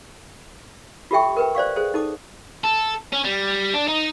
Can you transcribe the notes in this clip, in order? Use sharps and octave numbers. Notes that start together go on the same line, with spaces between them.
F4 G4 A4 E5 G5 C#6
A#4 B4 G5
C5 D5 F5 C#6
G#4 A4 C5
D#4 A4 D6
A4
C#4
G3
D4
D#4